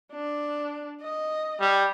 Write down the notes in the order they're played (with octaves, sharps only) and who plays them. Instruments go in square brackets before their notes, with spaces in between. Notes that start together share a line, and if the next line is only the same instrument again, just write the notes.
[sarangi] D4
D#5
[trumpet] G3